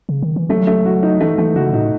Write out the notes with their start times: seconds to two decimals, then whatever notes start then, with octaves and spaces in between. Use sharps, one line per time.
0.09 C#3
0.22 D#3
0.36 E3
0.49 F#3 A3
0.67 A3
0.85 F#4
1.03 D#4
1.20 E3 A3
1.38 E3 A3
1.56 C#3 F#4
1.73 A2 D#4